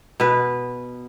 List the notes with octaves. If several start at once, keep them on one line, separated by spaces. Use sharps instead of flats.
B2 B4